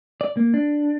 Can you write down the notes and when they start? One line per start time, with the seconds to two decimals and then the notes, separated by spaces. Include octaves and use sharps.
0.21 D5
0.37 A#3
0.54 D4